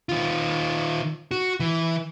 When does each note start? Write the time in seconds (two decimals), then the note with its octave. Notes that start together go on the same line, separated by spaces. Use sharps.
0.09 D#3 F4
1.31 F#4
1.60 E3